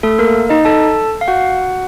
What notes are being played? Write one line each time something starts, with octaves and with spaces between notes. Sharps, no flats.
A3 A4
A#3 A#4
D#4 D#5
A4 A5
F5
F#4 F#5